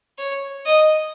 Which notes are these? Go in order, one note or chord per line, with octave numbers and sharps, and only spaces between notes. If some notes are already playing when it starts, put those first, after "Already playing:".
C#5
D#5